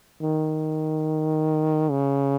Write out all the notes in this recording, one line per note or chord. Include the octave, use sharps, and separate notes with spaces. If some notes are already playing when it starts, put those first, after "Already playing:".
D#3
C#3